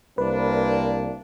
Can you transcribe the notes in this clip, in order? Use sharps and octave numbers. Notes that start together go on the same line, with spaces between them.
C2 A#3 C4 D4 B4